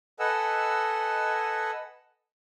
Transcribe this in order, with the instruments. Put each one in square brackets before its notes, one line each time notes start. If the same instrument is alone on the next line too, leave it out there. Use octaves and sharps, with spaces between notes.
[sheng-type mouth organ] A4 B4 D#5 F#5 G#5 E6